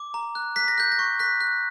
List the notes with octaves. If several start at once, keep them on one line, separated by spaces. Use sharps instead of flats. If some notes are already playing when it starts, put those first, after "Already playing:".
Already playing: D6
A#5
F#6
F#6 B6
A#6
F#6 G6
A#6
C#6
F#6 B6
F#6